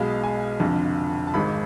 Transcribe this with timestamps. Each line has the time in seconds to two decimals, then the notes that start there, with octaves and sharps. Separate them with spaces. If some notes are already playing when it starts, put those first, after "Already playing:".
Already playing: B1 B2 G#3 F5
0.24 G#5
0.60 F1 F2 D3
1.27 A5
1.34 G#1 G#2 G#3 B5